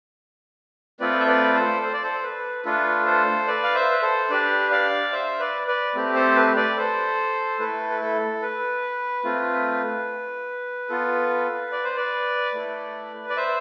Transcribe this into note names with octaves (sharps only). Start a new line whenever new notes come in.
A3 C4 F4 A4 B4 D5
E5
B4 D5
A4 C5
C5
D5
A4 C5
B4
A3 D4 F4 A4 B4
A4 C5
B4 D5
F5
C5 E5
B4
A4 C5
D4 G4 B4 D5
D5 F5
C5 E5
B4 D5
B4 D5
A3 C4 G4
A4 C5
B4
B4 D5
A4 C5
A3 E4 A4 B4
B4
A4
B4
A3 C4 F4
B3 F4 A4
D5
C5
B4 D5
A3 E4 A4
D5
C5 E5